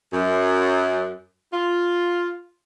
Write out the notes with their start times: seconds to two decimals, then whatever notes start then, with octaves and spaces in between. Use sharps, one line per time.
0.13 F#2
1.53 F4